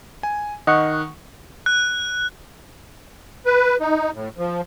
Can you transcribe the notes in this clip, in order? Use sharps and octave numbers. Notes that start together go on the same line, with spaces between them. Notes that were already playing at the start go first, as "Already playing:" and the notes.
G#5
D#3 D#5 F#5 C#6
F#6
B4
D#4
A2
F3